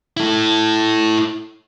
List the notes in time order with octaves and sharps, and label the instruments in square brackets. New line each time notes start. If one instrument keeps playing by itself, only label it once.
[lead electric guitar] E4 A4